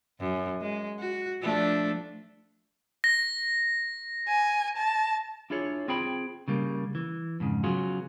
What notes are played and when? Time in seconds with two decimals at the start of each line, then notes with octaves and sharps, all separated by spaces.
0.20 F#2
0.61 G#3
0.99 F#4
1.42 F3 A3 D4
3.04 A#6
4.28 G#5
4.77 A5
5.50 D4 E4 F4 G#4 C#5
5.88 C4 F4 G#4 C5 G5 B5
6.48 C#3 G3 A#3
6.95 E3
7.40 F2 G#2 C#3
7.63 C#3 F#3 B3 F4 F#4 G#4